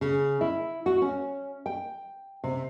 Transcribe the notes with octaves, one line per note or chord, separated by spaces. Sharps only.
C#3
E4
F#4
C#4
G5
C3